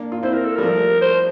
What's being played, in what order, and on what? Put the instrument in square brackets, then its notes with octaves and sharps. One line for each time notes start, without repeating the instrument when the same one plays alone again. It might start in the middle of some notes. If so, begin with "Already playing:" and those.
Already playing: [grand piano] A#3 D4
F4
[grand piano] C4 E4 [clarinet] C5
[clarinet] A#4
A4
[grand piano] G3 [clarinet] A#4
[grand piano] F3 A3
[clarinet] C5